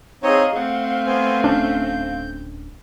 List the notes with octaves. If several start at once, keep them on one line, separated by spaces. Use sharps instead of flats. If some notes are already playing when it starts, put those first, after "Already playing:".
C4 D#4 G#4 C#5 D#5 F5
A3 C4 F#5
B3 C5 G#5
D1 C#4 D4 G6